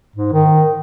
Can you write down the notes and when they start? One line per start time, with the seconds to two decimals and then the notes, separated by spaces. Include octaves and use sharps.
0.16 G#2
0.33 D#3